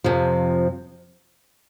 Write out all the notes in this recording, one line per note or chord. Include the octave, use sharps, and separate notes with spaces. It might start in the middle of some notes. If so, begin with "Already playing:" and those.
F2 C3 F3